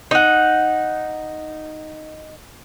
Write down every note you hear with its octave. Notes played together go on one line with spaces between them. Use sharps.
D#4 F#5